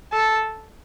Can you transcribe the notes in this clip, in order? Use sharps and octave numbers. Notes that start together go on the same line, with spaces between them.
A4